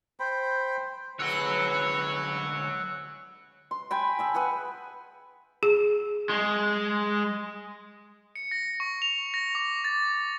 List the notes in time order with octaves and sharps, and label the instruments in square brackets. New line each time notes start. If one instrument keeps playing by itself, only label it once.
[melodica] C5 G5 B5
[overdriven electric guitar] D2 G#3 [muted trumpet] B4 [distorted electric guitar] C#5 F#5 [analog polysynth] E6 F#6
[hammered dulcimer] C6
G5 G#5 B5
G#4 E5 A5
G#4 B4 F#5 G#5
[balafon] G#4
[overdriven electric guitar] G#3
[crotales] C#7
A#6
C#6
F7
A#6
D6
A6